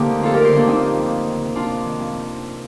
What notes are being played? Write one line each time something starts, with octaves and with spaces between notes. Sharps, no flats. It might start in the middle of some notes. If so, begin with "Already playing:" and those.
Already playing: D3 A#3 C4 D#4 G4
D2
F2 F4 A4
F2 G4 A#4
A4 C5
D3 A#3 D4
D3 C4 D#4
F2
F2
F2
D#3
C3
F2 D4 F4
F2
D#3
F2